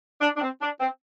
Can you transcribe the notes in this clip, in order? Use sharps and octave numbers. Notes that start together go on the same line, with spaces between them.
D4
D4
C4
D4
C4